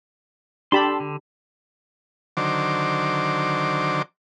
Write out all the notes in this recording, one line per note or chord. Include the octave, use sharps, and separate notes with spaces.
D4 G4 A4 A5 B5 C6
D3
D3 D#3 F#3 C5 D6